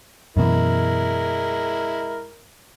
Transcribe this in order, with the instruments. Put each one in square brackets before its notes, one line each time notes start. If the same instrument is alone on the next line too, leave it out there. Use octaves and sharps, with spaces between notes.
[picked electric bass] F#2 B2 E3 [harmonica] G#3 E4 A#4